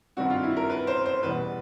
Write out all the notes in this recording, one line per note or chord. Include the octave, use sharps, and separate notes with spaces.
G2 D#3 G3 C4 F#4
F4
E4
A#4
B4
C5
C5
E2 B2 G3 B4